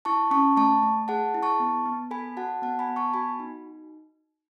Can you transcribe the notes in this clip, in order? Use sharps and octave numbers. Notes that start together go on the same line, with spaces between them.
E4 A5 C#6
C#4 A5 C#6
A3 A5 C#6
A3
G#4 F#5 A5
E4
A5 C#6
B3
B3
A4 G#5 B5
F#4 F#5 A5
B3 F#5 A5
G#5 B5
B3
A5 C#6
F#4 G#5 B5
D#4